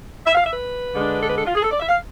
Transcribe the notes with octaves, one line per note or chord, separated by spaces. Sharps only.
E5
F5
E5
B4
D3 G#3 D4
A4
B4
A4
F4
G#4
A4
D5
E5
F5